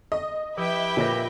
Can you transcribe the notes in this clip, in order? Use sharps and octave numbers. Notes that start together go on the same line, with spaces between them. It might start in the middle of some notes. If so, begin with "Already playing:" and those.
D#5
F3 E4 G4 B4 E5 G5
A#2 A#4 C#5 D#5 A#6